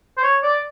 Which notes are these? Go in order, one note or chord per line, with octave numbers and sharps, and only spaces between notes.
C5
C#5
D5